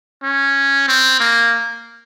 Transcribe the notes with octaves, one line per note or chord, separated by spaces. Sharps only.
C#4
C4
A#3